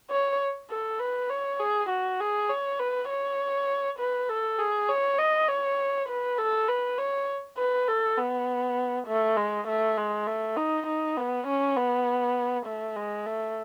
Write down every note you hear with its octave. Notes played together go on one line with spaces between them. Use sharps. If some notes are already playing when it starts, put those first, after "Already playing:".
C#5
A4
B4
C#5
G#4
F#4
G#4
C#5
B4
C#5
B4
A4
G#4
C#5
D#5
C#5
B4
A4
B4
C#5
B4
A4
B3
A3
G#3
A3
G#3
A3
D#4
D#4
B3
C#4
B3
A3
G#3
A3